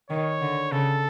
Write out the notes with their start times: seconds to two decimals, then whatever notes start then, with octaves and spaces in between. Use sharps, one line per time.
0.10 D#3 C#5
0.41 D3
0.72 C#3 A4